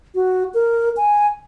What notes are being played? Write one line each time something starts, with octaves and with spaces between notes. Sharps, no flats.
F#4
A#4
G#5